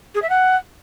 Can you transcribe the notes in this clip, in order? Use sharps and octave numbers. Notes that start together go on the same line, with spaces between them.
G#4
E5
F#5